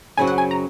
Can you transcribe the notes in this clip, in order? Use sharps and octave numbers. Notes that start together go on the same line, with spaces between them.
F#2 C#3 F#3 C4 F#4 G#5
F#5
G#5
A#5